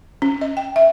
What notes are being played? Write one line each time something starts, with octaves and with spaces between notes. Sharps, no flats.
C#4
D#5
G5
E5